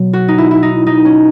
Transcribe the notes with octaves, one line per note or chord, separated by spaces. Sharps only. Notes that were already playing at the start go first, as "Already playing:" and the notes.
Already playing: B2 F#3
F#4
D#4
E4
E4
D#4
D#4
C#4